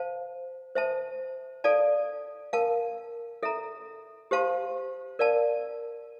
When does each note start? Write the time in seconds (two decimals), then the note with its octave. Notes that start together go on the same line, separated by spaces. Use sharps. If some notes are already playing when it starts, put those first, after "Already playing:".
Already playing: C5 F5 A5
0.75 C5 E5 A5
1.64 A4 D5 F5 A5
2.53 A#4 F5 A5
3.43 A4 E5 A#5
4.31 G4 C5 F5 A5 C6
5.19 A#4 D5 F5 A5